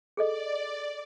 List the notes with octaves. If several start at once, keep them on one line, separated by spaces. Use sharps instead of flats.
G#4 A4 D5 D#5